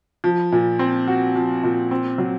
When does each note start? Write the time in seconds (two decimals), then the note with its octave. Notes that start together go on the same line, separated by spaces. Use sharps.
0.24 F3
0.52 A#2
0.79 C4
1.08 F#4
1.36 F3
1.63 A#2
1.91 C4
2.18 F#3